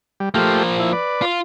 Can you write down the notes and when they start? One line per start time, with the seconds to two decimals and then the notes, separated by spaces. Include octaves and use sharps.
0.20 G3
0.34 F3 A3 A#3 F4 G4
0.79 E4
0.93 B4 D5
1.22 F4